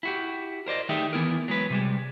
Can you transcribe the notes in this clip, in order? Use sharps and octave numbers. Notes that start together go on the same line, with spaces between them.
E4 F#4 G4
A#4 C5 D5 D#5
D#3 A3 D#4 G4 G#4 E5
E3 B3 E4 A#4
F#3 G#3 B4
C3 G3 G#3